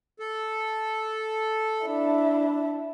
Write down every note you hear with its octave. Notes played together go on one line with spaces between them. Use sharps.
A4
D4 E4